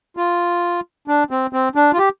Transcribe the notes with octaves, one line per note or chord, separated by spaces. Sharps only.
F4
D4
C4
C4
D4
F4
G4